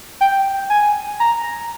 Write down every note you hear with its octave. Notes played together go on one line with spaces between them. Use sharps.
G5
G#5
A#5